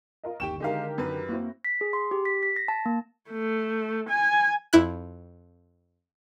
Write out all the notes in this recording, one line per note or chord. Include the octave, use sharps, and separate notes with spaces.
F4 A#4 D#5
G1 D#2 D#3 G4 G5 C#6 E7
D3 D#3 G#3 G4 A#4 F5
F#2 B4
A#3 C4 E4 F#4
B6
G#4
C6
G4
B6
B6
A#6
A5
A#3
A3
G#5
F2 E4 F#6